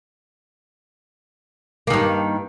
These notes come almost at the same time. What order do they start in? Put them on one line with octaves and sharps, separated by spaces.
A#3 D#3 G2